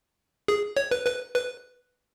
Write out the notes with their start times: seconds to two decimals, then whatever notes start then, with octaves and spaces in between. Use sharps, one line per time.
0.48 G#4
0.77 C#5
0.91 B4
1.07 B4
1.35 B4